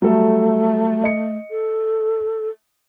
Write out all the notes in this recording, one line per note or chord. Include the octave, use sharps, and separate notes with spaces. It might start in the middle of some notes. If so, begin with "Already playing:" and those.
F#3 G3 A3 A4
D#5 C#7
A4